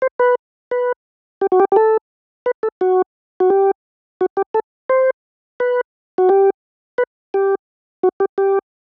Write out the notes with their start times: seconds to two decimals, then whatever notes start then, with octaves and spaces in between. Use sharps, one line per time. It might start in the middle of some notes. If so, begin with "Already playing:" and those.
0.02 C5
0.19 B4
0.71 B4
1.41 G4
1.52 F#4
1.60 G4
1.72 G4
1.76 A4
2.46 B4
2.63 A4
2.81 F#4
3.40 F#4
3.50 G4
4.21 F#4
4.37 G4
4.54 A4
4.89 C5
5.60 B4
6.18 F#4
6.29 G4
6.98 B4
7.34 G4
8.03 F#4
8.20 G4
8.38 G4